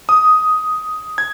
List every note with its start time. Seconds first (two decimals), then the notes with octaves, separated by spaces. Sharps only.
0.09 D#6
1.18 G#6